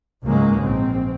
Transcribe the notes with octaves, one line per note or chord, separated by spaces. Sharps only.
C#2 G#2 C#3 F#3 G#3 A#3
A#1 C4